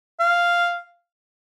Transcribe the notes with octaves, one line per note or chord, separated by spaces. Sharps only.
F5